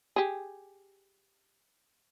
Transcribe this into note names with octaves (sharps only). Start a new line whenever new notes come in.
G4 G#4